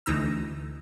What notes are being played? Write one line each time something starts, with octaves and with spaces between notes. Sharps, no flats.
D2 E3 D#4 A#5 E6